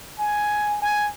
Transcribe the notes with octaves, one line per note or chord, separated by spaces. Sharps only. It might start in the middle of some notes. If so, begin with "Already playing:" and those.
G#5
G#5